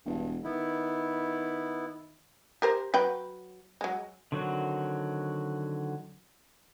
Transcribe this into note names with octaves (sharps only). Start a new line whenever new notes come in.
E1 G2
D#3 B3 E4
G4 A#4 C5
F#3 B4 G5
F#3 G#3
D3 D#3 F#3 C4 F#4